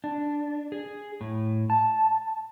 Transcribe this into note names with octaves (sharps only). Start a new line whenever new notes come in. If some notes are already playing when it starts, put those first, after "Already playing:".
D4
G#4
A2
A5